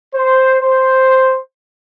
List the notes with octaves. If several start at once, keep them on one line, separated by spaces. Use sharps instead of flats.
C5
C5